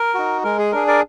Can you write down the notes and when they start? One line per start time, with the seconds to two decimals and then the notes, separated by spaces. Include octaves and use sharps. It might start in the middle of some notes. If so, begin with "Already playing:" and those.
Already playing: A#4
0.14 D#4 F#4
0.44 G#3 A#4
0.59 G#4
0.72 D4 G#4 A#4
0.87 A#4 D5